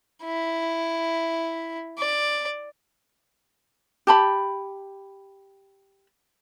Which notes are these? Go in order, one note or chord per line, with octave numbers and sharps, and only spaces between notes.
E4
D5
G4 A5 B5